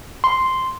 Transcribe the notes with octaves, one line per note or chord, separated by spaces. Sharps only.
C6